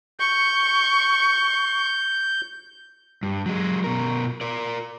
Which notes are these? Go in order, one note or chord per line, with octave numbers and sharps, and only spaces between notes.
C#6 G6
G2
F#3 G#3
B2 A#4
A#4 D5